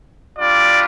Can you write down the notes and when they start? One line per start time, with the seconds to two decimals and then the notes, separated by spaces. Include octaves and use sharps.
0.39 G3 D4 F4 D5